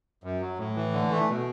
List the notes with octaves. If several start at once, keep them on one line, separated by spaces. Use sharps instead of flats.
F#2
F#3
A2
E3
D3
A3
B2